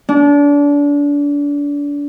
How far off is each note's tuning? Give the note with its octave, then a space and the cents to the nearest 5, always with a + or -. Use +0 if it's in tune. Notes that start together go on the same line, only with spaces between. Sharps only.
D4 -30